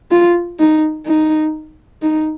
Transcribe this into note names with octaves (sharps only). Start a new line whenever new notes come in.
F4
D#4
D#4
D#4